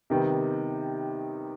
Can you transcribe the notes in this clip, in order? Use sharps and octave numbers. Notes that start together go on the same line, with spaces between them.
C3 D#3 G3 B3